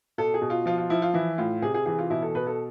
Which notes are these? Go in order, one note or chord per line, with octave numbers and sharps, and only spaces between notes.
B2 A4
G#4
B2
F4
F3 F4
F4
F3 E4
F4
E3 E4
A2 F4
C3 G#4
G#4
E3 G#4
F4
B2 E4
A4
B2 B4
A4